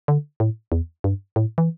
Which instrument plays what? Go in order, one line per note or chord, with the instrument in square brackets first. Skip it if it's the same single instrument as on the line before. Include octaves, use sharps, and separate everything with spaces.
[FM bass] D3
A2
E2
G2
A2
E3